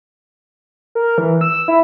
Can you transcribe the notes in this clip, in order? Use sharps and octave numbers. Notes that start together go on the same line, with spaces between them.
A#4
E3
E6
E4